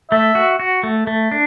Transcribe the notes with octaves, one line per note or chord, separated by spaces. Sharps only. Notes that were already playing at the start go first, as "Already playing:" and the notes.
A3 E5
F#4
F#4
A3
A3
D4